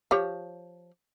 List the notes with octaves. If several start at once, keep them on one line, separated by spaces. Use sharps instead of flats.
F3 G4 C#5